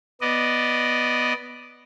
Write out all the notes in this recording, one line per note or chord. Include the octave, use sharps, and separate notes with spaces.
B3 D5 D#5